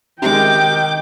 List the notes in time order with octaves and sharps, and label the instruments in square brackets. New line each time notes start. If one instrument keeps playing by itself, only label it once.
[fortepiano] C3 G#3 [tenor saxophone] D#3 [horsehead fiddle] G5 [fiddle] D6